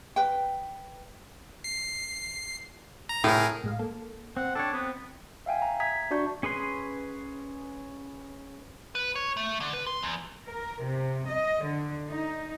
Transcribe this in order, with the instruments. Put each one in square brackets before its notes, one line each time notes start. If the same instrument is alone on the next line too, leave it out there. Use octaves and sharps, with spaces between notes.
[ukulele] B4 G5
[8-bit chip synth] C7
A#5
[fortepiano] A2 [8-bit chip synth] G#4 A#4
[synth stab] A2 G#3 F5
A#3 A4
[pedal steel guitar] C4 [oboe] F#5
[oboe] D4 [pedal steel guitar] A4 C#5 [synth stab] G5
[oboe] B3 [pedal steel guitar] C4
[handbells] E5 F5 G5 G#5
A#5
E5 A#5 D#6 G#6 B6
D4 F#4 D5 A5 C#6 G6
[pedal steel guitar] C#4 G#4 B4 C6
[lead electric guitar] B4
C#5
A3
D3
B4
C6
E2
[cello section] A#4
C3
D#5
D3
D#4